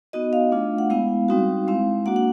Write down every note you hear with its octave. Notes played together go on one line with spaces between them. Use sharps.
B3 D#4 F#4 D#5
F5
A3 D4 F4
F#5
G#3 B3 E4 F5
G3 C4 D#4 F#4
G#3 C4 E4 F5
A#3 D4 F#4 F#5
F#5